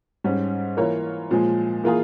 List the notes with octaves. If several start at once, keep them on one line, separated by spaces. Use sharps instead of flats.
G#2 G3 C#4
E3 A#3 F4 A#4 C#5
A#2 F3 G#3
E3 A#3 F4 G#4